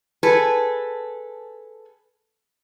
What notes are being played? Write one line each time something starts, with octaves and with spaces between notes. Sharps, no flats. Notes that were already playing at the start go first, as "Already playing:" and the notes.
G#4 A4 B4